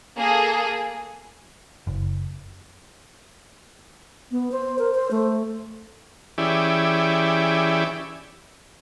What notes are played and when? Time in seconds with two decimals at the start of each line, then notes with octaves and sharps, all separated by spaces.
0.18 A#3 G#4 A4
1.87 F#1
4.31 B3
4.52 C5
4.79 A#4
4.94 C5
5.11 A3
6.38 E3 C#4 E4 G4 G#4 D5